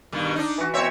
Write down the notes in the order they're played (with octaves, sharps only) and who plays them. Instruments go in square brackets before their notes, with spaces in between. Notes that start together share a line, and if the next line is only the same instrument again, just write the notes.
[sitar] G2 B2 D#3
D4 D#4
[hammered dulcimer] E3 F#4
[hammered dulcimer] B2 C4 [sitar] C#5 E5